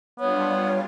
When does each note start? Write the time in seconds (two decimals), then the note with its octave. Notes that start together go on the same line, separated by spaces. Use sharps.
0.20 G3 B3 D4 F4 C#5